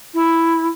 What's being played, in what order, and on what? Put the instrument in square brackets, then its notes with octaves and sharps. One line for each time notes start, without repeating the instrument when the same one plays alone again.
[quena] E4